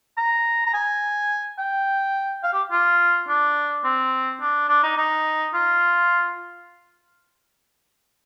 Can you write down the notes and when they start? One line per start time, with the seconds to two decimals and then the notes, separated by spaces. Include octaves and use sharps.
0.17 A#5
0.66 A#5
0.74 G#5
1.59 G5
2.43 F5
2.53 G4
2.72 F4
3.28 D4
3.84 C4
4.41 D4
4.69 D4
4.83 D#4
4.97 D#4
5.54 F4